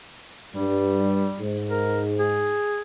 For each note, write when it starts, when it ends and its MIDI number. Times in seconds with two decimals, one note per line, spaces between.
0.54 1.30 43
0.54 1.42 55
1.40 2.58 44
1.71 2.01 70
2.19 2.82 68